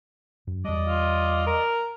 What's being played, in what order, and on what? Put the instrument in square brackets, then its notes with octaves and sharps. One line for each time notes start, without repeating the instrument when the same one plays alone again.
[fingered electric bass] F#2
[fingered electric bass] E2 G3 [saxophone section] D5 D#5
[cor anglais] F4
A#4